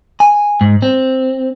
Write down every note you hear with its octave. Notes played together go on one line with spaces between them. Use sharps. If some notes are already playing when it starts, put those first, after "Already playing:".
G#5
G#2
C4